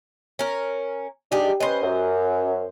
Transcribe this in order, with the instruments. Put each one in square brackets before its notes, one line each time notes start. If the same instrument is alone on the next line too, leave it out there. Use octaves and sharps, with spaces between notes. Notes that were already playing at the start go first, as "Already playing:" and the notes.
[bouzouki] C#4 A#4
[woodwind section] D4 D#4 [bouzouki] G4 G#4
[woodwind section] C#4 B4 [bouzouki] C5 D#5
[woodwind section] F#2